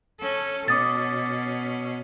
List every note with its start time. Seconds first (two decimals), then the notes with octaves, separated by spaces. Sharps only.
0.20 C#4 A4
0.68 B2 C#4 D6 D#6 A6